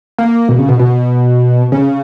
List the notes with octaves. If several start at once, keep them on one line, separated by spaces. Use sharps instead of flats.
A#3
B2
C#3
B2
B2
C#3